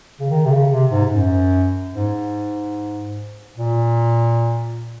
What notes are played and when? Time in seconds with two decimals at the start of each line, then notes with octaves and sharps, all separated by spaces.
0.20 C#3
0.30 D#3
0.46 C3
0.51 C#3
0.72 C3
0.91 G#2
1.12 F#2
1.95 G#2
3.58 A#2